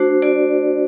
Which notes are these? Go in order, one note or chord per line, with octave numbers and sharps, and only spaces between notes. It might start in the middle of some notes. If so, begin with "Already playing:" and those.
Already playing: A3 D4 F#4 C5
D5